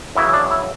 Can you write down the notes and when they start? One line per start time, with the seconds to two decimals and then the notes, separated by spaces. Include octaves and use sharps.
0.15 F#2 C#3 E3 E4
0.29 E4
0.33 D4
0.51 E4